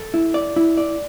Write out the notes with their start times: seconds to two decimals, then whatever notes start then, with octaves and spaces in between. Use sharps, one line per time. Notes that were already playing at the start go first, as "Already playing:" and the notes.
Already playing: A4
0.14 E4
0.34 D5
0.56 E4
0.78 D5